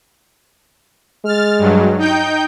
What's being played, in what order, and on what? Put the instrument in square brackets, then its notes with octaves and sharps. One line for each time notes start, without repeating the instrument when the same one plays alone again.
[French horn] G#3 [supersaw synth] F6 A6
[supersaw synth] G2 F#3
D#4 G5 G6